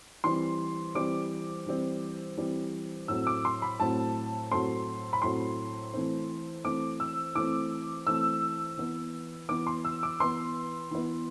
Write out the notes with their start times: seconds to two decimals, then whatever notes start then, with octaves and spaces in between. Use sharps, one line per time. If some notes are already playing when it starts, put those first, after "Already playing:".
0.24 E3 G3 C4 C6
0.95 E3 G3 C4 D6
1.67 E3 G3 C4
2.37 E3 G3 C4
3.08 A2 F#3 A3 C4 E6
3.27 D6
3.45 C6
3.62 B5
3.80 A2 F#3 A3 C4 A5
4.51 A2 F#3 A3 C4 C6
5.13 B5
5.22 A2 F#3 A3 C4 C6
5.93 E3 A3 C4
6.64 E3 A3 C4 D6
7.00 E6
7.35 E3 A3 C4 D6
8.07 E3 A3 C4 E6
8.78 E3 B3
9.49 E3 B3 D6
9.67 C6
9.85 E6
10.03 D6
10.20 E3 B3 C6
10.91 E3 B3